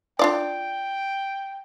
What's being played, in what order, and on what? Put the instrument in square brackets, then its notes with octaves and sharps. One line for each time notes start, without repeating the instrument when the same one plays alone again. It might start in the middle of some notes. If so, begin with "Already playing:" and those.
[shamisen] D4 F4 D5 [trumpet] G5